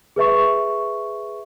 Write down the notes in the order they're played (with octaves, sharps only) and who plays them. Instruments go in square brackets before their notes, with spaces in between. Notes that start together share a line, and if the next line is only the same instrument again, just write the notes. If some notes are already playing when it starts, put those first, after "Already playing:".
[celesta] G#4 B4 E5 C#6